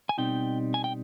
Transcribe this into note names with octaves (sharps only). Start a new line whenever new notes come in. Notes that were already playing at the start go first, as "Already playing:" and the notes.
G#5
B2 G3 C4 D#4 G5
G#5
G5